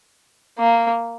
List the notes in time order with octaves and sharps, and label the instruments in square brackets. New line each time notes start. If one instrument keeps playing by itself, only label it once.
[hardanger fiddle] A#3